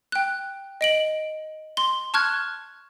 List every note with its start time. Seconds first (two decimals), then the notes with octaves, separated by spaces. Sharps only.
0.12 G5 F#6
0.81 D#5 D7 F#7
1.77 C6 G7
2.14 A5 C#6 F6 F#6 G#6